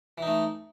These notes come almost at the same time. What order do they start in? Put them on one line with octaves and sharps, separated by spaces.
E3 D#4 A3